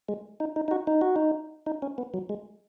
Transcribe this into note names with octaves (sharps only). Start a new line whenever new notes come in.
G#3
D#4
D#4
D#4
F#4
D#4
F#4
D#4
D#4
C#4
B3
F#3
G#3